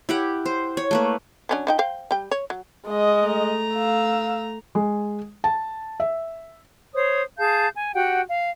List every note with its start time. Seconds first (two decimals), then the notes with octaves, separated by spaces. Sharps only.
0.09 E4 G4 F#5
0.46 C5
0.77 C#5
0.91 A3 A#3 B4
1.49 F#3 C#4 D4
1.67 F3 D#4 G5
1.79 C5 F5 G5
2.11 G3 G5
2.31 C#5
2.50 F#3
2.88 G#3 D#5
3.22 A3 A#5
3.74 F5 E6
4.75 G#3
5.44 A5
6.00 E5
6.94 C5 C#5 D#6
7.39 G#4 F5 A5 G6
7.76 G#5
7.95 F#4 G4 F#5 G5
8.29 F5